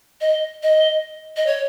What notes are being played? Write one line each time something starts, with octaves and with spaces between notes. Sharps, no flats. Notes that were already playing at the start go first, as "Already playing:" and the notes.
D#5
D#5
D#5
C#5